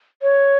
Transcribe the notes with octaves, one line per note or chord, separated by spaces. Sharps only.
C#5